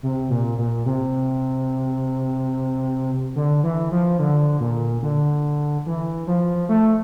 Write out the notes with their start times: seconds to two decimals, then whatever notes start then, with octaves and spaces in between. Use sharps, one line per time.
0.03 C3
0.30 A#2
0.58 A#2
0.86 C3
3.36 D3
3.63 E3
3.92 F3
4.19 D3
4.60 A#2
5.02 D3
5.86 E3
6.27 F3
6.69 A3